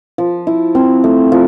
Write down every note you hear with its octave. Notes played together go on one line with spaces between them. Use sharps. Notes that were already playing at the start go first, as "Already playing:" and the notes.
F3
E4
C4
A3
F3